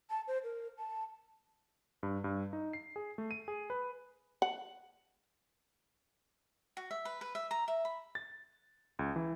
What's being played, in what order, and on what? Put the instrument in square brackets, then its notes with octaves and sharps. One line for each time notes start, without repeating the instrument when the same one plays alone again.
[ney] A5
C5
A#4
A5
[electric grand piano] G2
G2
D#4
C7
G#4
A3
D#7
G#4
B4
[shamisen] F#5
[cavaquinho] F#4
E5
B4
B4
E5
A#5
E5
B5
[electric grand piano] A6
C#2
E3